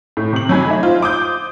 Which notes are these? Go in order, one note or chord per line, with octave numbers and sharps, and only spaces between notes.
A2
C3 F#7
F#3 D#4 G#5 B5 G#6
A3 D#4 E5
D#4 F4 C5
C5 D6 D#6 G6